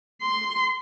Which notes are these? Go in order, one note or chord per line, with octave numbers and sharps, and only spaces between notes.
C6